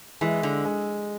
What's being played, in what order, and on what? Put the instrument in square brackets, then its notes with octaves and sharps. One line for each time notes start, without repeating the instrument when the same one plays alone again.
[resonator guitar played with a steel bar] E3 [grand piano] G#3
[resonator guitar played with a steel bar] D3
[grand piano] G#3